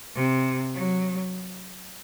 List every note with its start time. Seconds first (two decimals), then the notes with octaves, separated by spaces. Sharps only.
0.16 C3
0.75 F#3